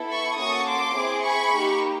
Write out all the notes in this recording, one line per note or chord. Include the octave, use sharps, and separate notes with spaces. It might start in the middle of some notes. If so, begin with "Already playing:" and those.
Already playing: B3 E4 A4
B5 C#6
A#3 C#4 F#4 A4 C#6 D#6
C6 D6
C4 E4 G#4
B5 C#6
A#3 D#4 G4